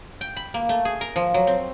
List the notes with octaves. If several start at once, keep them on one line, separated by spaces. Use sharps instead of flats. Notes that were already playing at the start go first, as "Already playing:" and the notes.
G5
B5
A#3
A3
G#4
A#4
F3
F#3
C4